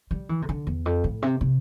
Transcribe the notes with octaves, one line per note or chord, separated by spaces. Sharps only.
G3
E3
C3
D3
E2
F2
A2
C3
C3